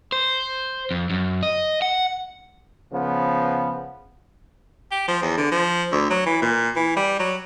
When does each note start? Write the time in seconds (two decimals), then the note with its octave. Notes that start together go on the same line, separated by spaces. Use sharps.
0.12 C5
0.91 F2
1.10 F#2
1.43 D#5
1.82 F#5
2.92 C#3 F3 B3
4.91 G4
5.08 F3
5.22 E2
5.37 D3
5.51 F3
5.92 D2
6.10 F#3
6.26 E3
6.42 A#2
6.76 E3
6.96 G3
7.19 F#3